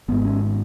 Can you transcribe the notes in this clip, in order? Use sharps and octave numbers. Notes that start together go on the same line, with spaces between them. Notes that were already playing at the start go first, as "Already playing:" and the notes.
G#1 G#2 B3
C#4